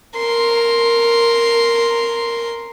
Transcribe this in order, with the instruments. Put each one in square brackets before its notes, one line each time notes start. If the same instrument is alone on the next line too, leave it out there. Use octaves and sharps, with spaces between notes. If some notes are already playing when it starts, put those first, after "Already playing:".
[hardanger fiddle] A#4 C6